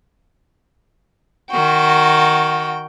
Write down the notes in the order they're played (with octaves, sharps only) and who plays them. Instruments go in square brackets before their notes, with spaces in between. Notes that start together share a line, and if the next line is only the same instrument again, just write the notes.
[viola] D#3 G5 [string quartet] F#4